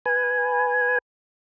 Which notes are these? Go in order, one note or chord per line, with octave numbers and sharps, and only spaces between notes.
B4 G#5